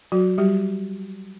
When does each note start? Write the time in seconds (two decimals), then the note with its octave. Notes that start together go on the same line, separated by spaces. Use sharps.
0.12 F#3 F#4
0.38 G3 G4